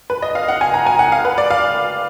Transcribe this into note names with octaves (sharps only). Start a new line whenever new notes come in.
B4
D#5
F5
F#5
G#5
A#5
G#5
F#5
F5
B4
D5
F5